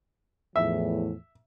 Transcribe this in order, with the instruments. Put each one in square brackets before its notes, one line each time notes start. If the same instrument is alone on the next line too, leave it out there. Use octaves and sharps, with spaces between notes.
[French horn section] E2 A2 F3 [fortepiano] E5